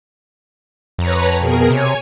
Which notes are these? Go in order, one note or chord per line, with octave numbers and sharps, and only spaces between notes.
F2 B4 C#5 A#5
B2 G#4 A#4
C3 C#5 G#5